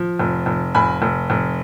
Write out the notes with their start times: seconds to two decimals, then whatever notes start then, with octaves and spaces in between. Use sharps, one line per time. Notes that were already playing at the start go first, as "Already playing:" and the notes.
Already playing: F3
0.19 F1
0.46 F1
0.75 F1 G#5 B5
1.02 F1
1.30 F1